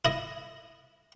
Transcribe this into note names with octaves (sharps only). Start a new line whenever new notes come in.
E4 D#5